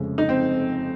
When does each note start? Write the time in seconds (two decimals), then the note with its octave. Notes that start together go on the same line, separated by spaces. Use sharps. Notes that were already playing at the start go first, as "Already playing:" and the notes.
Already playing: F1 F2 C#3 G#3
0.18 D#4
0.29 C4